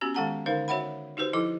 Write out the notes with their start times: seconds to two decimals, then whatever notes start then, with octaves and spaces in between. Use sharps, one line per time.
0.01 B3 C#4 F#4 G4
0.14 D#3 G#3 A4 F#5 A5 A#5
0.46 D3 D#4 A#4 C5 F5
0.68 F#4 C#5 E5 F#5 B5
1.17 D#4 F#4 G4 B4 C5
1.33 F3 E4 A4 D6